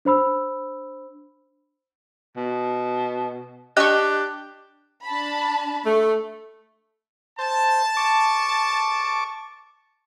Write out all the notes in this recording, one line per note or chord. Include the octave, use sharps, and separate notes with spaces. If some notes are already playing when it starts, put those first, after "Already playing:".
D4 C5 B5 E6
B2
D4 G4 D#5 C#6 F#6
D4 A5 B5
A3
C5 A5
C#6 D6